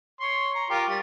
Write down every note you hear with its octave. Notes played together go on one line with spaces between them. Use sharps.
C#5 C6
A#5
F4 G4 A#4
G3